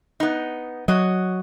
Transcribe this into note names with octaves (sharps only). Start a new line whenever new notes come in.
B3 D#4
F#3 F#4 C#5 D#5